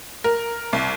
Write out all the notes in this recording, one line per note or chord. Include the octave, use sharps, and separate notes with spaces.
A#4
C2